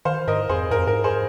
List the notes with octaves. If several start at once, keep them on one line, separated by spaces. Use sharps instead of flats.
D#3 C5 F5
G#2 A#4 D#5
F2 G#4 C5
G#2 A#4
F2
G#2 A#4
G#4 C5